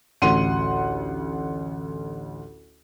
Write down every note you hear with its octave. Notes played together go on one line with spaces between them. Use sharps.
A1 D2 F#5 C6 D#7